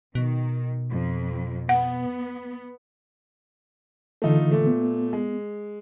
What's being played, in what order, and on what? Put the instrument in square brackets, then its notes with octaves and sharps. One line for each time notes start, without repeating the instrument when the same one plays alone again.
[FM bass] B2 [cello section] D#3
[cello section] F2
[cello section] B3 [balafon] F#5
[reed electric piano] D3 E3 A4 [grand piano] A3 D#4 F4
[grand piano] A#2 A3
[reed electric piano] B3
[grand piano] G#3